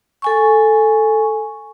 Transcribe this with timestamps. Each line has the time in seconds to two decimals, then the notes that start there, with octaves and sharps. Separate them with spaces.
0.22 A4 G#5 C#6